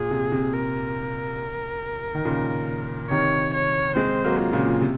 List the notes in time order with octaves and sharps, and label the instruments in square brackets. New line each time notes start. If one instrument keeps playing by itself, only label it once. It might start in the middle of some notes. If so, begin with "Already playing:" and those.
Already playing: [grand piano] A#2 [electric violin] G#4
[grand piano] C3
C3
[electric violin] A#4
[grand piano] D#3
A#2 C#3
[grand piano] C3 D#3 [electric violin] C#5
[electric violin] C#5
[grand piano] G#3 C4 [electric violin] C5
[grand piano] F#3 A#3
[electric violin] F4
[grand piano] A#2 C#3
C3